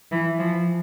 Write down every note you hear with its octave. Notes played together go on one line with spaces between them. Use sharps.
E3
F3